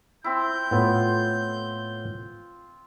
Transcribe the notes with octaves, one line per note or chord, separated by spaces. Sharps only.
C4 E4 G6
A2 B3 F4